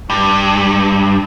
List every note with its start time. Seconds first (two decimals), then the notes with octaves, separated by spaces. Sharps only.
0.10 G2